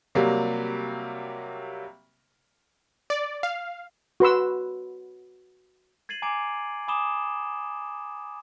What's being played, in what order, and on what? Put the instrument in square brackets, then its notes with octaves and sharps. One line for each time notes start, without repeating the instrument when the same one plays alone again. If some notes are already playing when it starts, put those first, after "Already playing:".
[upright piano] C3 F#3 G3 A#3
[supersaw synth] D5
F5
[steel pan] F#4 B4 C6 E6
[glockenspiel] G#6 A6 C7 D#7 F#7
G#5 A#5 D6 G#6 C7 D7
G#5 B5 D6 D#6 E7 G7